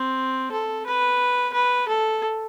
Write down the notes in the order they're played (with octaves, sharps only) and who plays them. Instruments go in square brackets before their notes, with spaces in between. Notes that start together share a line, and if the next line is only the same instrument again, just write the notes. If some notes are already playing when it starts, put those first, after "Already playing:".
Already playing: [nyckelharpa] C4
A4
B4
B4
A4